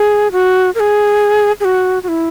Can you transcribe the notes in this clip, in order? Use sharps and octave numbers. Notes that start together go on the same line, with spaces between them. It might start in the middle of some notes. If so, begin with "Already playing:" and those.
Already playing: G#4
F#4
A#4
G#4
G#4
F#4
F#4
E4